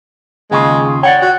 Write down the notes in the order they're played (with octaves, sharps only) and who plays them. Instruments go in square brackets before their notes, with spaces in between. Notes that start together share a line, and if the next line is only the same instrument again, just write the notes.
[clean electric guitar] D#2 C#3 F4 [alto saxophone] G#3
[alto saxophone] C#5 [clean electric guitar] D5 F#5 G5
[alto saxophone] F#4